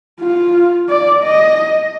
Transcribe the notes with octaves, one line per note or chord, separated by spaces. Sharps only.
F4
D5
D#5